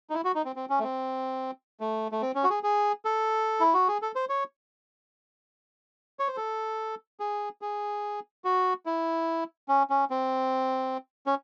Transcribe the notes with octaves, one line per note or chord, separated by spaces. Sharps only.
D#4
E4
F#4
D#4
C4
C4
C#4
A3
C4
A3
A3
C4
C#4
F#4
G#4
G#4
A4
E4
F#4
G#4
A4
C5
C#5
C#5
C5
A4
G#4
G#4
F#4
E4
C#4
C#4
C4
C#4